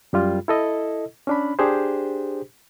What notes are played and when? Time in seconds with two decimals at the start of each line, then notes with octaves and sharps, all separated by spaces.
0.13 F#2 G3 F4
0.48 E4 A4 D#5
1.27 C#4 D4 B5
1.59 D4 G4 G#4 C5